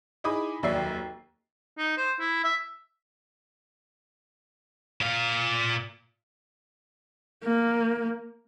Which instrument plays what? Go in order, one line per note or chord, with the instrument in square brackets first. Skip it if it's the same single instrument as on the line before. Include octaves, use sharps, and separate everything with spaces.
[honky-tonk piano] D#4 E4 G#4 B5 D6 D#6
F1 D#2 F#3 D5 E5 C7
[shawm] D#4
C5
E4
E5
[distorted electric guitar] A#2 F5
[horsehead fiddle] A#3